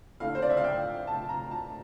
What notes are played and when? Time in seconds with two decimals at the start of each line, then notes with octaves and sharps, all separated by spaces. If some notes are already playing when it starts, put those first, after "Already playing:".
0.20 D3 A3 E4 F5
0.35 C5
0.42 D5
0.49 E5
0.57 F5
0.64 G5
1.07 A5
1.29 A#5
1.51 A5